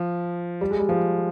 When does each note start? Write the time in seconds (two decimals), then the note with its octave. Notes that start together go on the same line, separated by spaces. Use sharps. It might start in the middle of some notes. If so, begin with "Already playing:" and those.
Already playing: F3
0.61 G3
0.71 G#3
0.79 G3
0.89 F3